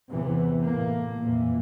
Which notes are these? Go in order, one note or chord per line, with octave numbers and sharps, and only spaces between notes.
E2 C3 E3 B3
A2 A3 A#3
F2 A#2 E3